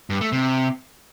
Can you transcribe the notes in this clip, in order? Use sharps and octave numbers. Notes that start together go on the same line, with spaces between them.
G2
A3
C3